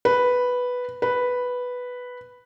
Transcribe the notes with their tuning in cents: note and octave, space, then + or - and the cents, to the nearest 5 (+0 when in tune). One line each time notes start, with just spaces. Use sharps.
B4 +0
B4 +0